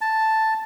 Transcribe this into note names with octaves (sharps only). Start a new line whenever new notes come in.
A5